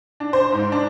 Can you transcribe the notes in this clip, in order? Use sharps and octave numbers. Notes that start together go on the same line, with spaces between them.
D4
C5
G#2
D4